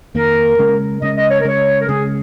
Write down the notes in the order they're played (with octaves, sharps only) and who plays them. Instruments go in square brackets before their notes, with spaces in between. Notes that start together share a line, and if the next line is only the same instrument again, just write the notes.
[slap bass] F2 D#3 A#3 [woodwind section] A#4
[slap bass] C#3 G#3 C#4
[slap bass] C#3 G#3 C#4 [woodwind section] D#5
[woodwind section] D#5
C#5
A#4
[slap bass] C#3 G#3 C#4 [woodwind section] C#5
[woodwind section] A#4
[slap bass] C#3 G#3 C#4 [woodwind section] G#4